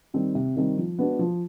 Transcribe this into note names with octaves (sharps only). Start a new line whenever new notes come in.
D#3 G3 C4
C3
D#3 G3 C4
F3
G#3 B3 D4 F#4
F3